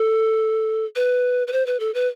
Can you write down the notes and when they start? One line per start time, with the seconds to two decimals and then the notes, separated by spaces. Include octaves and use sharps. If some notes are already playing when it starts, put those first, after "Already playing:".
Already playing: A4
0.96 B4
1.48 B4
1.53 C5
1.67 B4
1.80 A4
1.94 B4